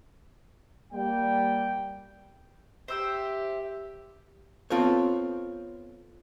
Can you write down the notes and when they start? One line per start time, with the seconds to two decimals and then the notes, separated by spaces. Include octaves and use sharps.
0.92 G3 A#3 G5
2.88 G4 C5 E5 G5
4.70 B3 C4 F4 A4 C5 C#5